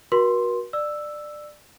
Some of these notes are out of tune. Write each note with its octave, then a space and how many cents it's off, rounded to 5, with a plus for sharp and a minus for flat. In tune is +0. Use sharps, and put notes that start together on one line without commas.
F#4 +0 A#4 +45 C6 +5
D5 +20 E6 +0